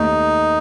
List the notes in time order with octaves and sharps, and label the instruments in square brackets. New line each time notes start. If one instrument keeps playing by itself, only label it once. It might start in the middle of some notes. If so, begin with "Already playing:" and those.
Already playing: [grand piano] D#2 A3 [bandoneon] D#4